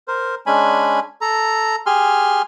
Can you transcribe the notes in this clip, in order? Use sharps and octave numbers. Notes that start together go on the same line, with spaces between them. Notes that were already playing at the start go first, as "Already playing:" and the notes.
A#4 C5
G#3 C#4 D4 G#5 B5
A4 A#5
G4 G#4 G#5 C6 F6